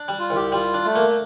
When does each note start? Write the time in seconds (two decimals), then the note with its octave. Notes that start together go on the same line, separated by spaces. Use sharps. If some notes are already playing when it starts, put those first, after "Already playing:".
Already playing: D4
0.08 G3
0.19 F4
0.30 C2
0.36 G4
0.52 G3 F4
0.74 D4
0.85 A3
0.95 A#3
1.10 A3